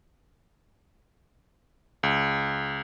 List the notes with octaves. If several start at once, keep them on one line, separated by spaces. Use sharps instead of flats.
C#2